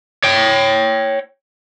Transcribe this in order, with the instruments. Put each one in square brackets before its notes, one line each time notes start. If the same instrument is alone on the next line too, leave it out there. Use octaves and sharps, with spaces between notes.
[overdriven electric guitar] C#5 G5